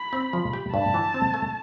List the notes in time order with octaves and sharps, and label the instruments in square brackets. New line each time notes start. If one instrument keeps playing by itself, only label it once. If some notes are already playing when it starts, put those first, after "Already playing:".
Already playing: [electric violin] B5
[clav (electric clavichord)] C4
F3
G4
[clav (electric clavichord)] G2 [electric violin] A5
[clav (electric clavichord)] E3
C4
A3